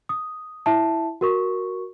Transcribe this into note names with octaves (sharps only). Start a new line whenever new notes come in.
D#6
E4 E5 A5
F#4 A#4 C#6